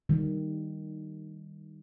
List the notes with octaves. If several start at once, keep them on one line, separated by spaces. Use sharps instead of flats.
D#3 G3